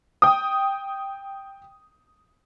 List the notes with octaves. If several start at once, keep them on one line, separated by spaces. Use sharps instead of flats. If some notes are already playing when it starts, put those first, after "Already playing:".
G5 D#6